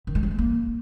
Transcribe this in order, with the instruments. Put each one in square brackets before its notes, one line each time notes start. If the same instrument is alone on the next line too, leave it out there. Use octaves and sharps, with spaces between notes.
[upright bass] D#3
G#3
F#3
A3
A#3